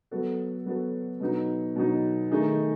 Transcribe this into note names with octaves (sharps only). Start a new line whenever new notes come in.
F#3 B3 F#4 A4
F#3 B3 F#4 A4
B2 F#3 B3 D#4
B2 F#3 B3 D#4
D#3 A3 D#4 G#4